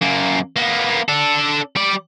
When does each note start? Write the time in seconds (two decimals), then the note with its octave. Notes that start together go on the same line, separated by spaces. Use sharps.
0.02 F#2 A#3
0.56 A#3 B3
1.08 D4 A4
1.76 G3 D5